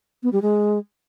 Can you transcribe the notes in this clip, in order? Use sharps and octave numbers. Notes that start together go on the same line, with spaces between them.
B3
G3
G#3